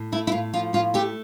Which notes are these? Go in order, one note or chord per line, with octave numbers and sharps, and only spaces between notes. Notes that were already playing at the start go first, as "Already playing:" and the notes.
Already playing: A2
A3 E4
E4
A2 F4
F3 F4
A2 F4
A3 G4